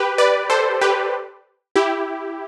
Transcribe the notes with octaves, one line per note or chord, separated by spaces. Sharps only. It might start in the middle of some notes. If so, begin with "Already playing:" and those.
Already playing: G4 B4
B4 D5
A4 C5
G4 B4
E4 G4